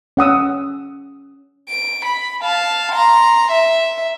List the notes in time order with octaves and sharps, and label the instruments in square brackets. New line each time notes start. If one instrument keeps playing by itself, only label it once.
[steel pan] C#4 F#5 D#6 E6
[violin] D7
B5
F5 A5
A#5 C6
E5